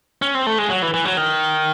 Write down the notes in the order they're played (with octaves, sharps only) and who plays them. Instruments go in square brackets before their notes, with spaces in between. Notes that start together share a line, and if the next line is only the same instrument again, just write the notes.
[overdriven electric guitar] C#4
C4
A3
G#3
F#3
E3
E3
F#3
D#3